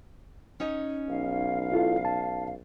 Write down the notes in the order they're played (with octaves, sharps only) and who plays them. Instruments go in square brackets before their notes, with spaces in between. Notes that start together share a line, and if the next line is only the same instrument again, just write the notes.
[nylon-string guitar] C#4 D#4 D#5
[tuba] B1 [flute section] F5
[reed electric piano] E4 F4 A4
A5